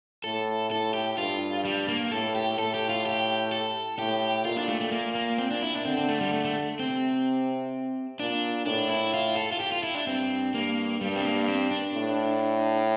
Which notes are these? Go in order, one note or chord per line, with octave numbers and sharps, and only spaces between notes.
A2 A4
A2 A4
G4
G2 F4
G3
A#3
A2 A4
G4
A2 A4
G4
F4
G4
A4
A2 G4
A#2 F4
D4
A3
A3
A#3
A#3
C4
D4
E4
D4
D3 C4
C4
A3
G3
A3
A3
C3 C4
A#2 D4
A2 D4
E4
F4
A4
F4
G4
F4
E4
D4
G2 C4
G2 A#3
G2 G3
C4
A#3
C4
D4
A2